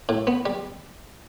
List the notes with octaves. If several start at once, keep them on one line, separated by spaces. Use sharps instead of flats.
A2
B3
G3